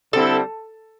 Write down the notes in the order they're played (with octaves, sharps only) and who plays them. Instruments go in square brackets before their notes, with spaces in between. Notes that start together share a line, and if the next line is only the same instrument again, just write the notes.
[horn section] D3 G3 C4 E4 [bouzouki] A4